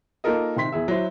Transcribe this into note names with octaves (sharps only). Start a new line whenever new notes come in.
A#3 D#4 F4 A4 A#4 D#5
C3 D#3 C6 B6
E2 G#4 E5
F#3 E4 C5